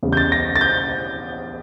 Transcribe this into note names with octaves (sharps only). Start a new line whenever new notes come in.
E2 C#3 G3
G6
A6
A#6
A6
G6